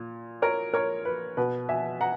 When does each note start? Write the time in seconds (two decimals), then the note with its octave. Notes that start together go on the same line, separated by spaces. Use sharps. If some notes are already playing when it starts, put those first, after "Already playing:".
Already playing: A#2
0.42 A#4 C#5
0.74 A#4 C#5
1.05 B4
1.37 B2 B4
1.69 E5 G#5
2.01 F#5 A#5